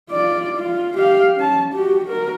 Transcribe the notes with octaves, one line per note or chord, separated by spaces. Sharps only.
F4 D5
F4
G4 F5
C#4 A5
F#4 G4
F#4 A#4